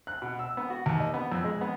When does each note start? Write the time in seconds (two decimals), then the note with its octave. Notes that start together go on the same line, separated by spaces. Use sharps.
0.07 F#6
0.22 B2
0.39 E6
0.57 B3
0.70 F#4
0.86 D#2
1.00 D#5
1.14 B3
1.32 F2
1.44 G#3
1.61 B3